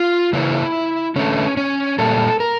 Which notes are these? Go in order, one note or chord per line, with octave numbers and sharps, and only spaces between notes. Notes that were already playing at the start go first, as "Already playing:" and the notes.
Already playing: F4
C#3 E3 A#3 E4
D3 A3 C#4
C#4
A#2 G3 A#3 A4
A#4